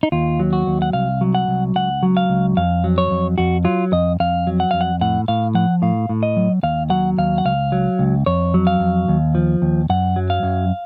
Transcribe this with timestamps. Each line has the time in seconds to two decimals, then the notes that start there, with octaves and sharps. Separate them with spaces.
0.03 D#4
0.12 D#2 F4
0.39 F#3
0.53 F#4
0.67 D#2
0.82 F#5
0.93 C2 F5
1.21 F#3
1.35 F#5
1.48 C2
1.76 C#2 F#5
2.03 F#3
2.17 F5
2.30 C#2
2.57 F2 F5
2.84 F#3
2.98 C#5
3.11 F2
3.38 F2 F#4
3.65 F#3 F4
3.92 F2 D#5
4.20 F2 F5
4.47 F#3
4.60 F#5
4.71 F2 F5
4.81 F#5
5.01 A2 F#5
5.28 A2 F5
5.55 F3 F#5
5.82 A2 F5
6.09 A2
6.23 D#5
6.37 F#3
6.63 D#2 F5
6.90 F#3 F#5
7.18 D#2 F5
7.38 F#5
7.45 C#2 F5
7.72 F#3
7.99 C#2
8.26 F2 C#5
8.54 F#3
8.67 F5
8.80 F2
9.08 D#2
9.35 F3
9.62 D#2
9.90 F#2 F#5
10.16 F#3
10.30 F5
10.43 F#2